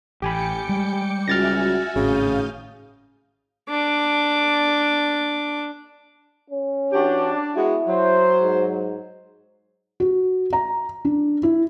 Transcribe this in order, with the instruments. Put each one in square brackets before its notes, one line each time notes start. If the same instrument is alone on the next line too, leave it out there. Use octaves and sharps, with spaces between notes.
[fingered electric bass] A1 [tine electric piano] G4 G#5 B5 [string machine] G5 D6 C#7
[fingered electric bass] G3 G#3
[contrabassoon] C#2 [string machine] F#4 E5 G#5 [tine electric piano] F6 A6 A#6
[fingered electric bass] G#1 A2 [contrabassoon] C#3 [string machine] F5 D#6 G6
[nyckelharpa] D4 D6
[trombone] C#4
[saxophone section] E3 F#4 G4 [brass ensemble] D4
[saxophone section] G#3 B3 F#4 [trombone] E4
[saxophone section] F#3 [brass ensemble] C5
[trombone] G#2
[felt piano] F#4
A#5
D4
E4